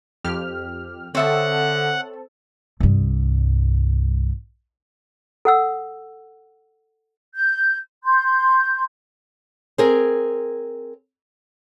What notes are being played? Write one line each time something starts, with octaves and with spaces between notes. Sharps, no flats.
F2 G4 F6
D3 C4 A4 C#5 E5 F#5 D#6
C2 G2
A4 F#5 E6
G6
C6 G6
C4 G#4 A#4